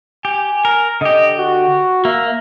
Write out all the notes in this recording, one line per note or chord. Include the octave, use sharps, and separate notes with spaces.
G4 G#5
A#4
D3 G4 D#5
F#4
A#3 E5